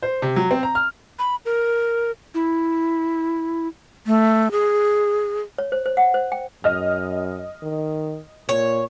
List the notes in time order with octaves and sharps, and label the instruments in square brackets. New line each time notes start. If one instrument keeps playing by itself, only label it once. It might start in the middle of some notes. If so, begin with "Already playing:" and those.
[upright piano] C5
C3
F#3
C4
A#5
F6
[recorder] B5
A#4
E4
[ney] A3
G#4
[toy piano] C#5
C5
C5
F#5
C5
G5
[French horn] F#2 [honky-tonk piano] D#5 F6
[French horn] D#3
[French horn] A#2 [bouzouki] C#5